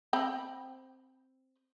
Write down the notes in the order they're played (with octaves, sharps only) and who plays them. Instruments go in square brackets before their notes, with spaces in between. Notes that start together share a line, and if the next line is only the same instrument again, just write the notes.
[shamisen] C4 G5 B5